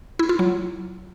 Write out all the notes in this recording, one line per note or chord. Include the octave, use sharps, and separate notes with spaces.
E4
F4
F#3